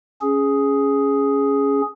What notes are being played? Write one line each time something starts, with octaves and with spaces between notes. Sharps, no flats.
C#4 G#4